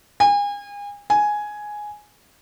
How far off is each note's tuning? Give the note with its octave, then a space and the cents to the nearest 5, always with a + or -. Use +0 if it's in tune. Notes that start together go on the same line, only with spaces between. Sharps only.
G#5 -35
G#5 +5